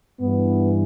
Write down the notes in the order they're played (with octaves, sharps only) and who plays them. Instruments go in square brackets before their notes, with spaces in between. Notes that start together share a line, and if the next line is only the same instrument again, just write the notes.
[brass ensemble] G2 E3 B3